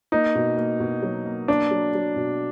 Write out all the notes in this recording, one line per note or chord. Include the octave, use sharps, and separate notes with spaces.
A#3 D#4
B2
A#3
B2
F#3
A#3
A#3 D4
F#3
F#3
B2